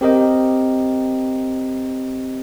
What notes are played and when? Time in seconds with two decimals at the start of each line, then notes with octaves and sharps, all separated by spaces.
0.01 C4 G4 A#4 D#5 G5